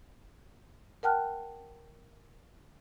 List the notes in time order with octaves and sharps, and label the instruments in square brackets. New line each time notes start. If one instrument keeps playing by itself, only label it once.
[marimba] A#4 F#5 G5 A5 F6 F#6